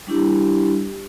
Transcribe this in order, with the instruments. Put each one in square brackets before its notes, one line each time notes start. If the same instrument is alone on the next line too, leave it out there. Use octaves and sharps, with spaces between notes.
[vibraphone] G3 D4 E4 G4